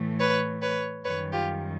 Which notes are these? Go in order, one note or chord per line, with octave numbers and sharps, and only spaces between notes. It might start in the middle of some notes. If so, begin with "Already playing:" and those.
Already playing: A2 E3 A3
B4 C#5
B4 C#5
F#2 D#3 G3 B4 C#5
F4 G4